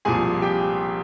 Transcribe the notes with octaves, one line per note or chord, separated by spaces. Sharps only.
C2 A#2 F3 G#4 G#5
G4 G5